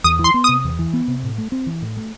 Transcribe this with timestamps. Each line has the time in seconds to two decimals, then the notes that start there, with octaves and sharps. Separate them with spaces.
0.04 E2 D#6
0.19 E3
0.24 C6
0.34 B3
0.44 C3 D#6
0.64 E2
0.79 E3
0.93 B3
1.08 C3
1.23 A2
1.38 A3
1.52 C4
1.67 E3
1.82 A2
1.97 A3